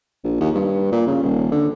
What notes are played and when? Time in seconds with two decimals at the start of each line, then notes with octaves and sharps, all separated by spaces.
0.24 A#1
0.40 D#2
0.55 G2
0.92 A#2
1.07 C#3
1.23 D#1
1.52 D3